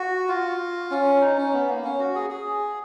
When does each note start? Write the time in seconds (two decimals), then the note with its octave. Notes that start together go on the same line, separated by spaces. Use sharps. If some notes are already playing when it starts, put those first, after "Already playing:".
Already playing: F#4
0.29 F4
0.91 C#4
1.21 D#4
1.38 C#4
1.53 B3
1.69 A#3
1.84 C#4
1.99 F#4
2.15 G#4
2.30 G#4